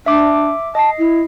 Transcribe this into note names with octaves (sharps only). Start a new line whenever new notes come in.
D4 E5 D6
D#5 A5 C7
E4